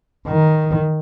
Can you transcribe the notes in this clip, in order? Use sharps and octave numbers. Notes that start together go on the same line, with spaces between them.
D#3